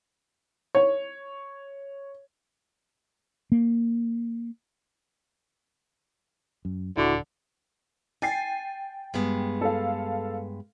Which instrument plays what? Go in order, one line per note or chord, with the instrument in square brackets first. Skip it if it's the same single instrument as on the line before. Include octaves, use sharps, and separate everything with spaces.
[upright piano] C#5
[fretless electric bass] A#3
F#2
[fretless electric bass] D#1 [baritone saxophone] D3 [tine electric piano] E4 F#4 D6
[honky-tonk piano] G5 A6 C7 [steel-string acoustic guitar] G#5
[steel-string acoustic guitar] G2 G#3 B3
[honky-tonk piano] A4 F5